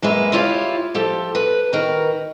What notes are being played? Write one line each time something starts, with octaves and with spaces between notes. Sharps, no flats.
F#2 G#3 A#3 B4 E5
E4 F4 G4 C#5 E5 F5
F3 G4 A4
B4
D#3 F#4 A#4 B4